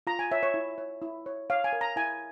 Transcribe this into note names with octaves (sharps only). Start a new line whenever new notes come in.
F4 A#5
G#5
C#5 E5
C#5
E4
C#5
E4
C#5
C#5 F5
G#5
A#4
A#5
E4 G#5